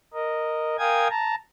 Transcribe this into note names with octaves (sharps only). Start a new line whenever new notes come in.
A#4 D#5
A#4 F5 G5 G#5 D#6 G#6
A5 A#5